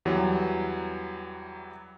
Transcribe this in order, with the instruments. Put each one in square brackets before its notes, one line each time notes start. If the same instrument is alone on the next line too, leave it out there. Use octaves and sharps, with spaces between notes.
[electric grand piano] E2 E3 F#3 G3